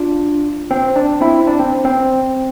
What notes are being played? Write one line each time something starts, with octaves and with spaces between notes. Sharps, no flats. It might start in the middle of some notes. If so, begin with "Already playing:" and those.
Already playing: D4 F4
C4
D4
C4 E4
D4
C4
C4